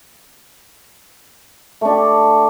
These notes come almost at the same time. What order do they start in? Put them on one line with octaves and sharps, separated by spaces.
A3 D4 G4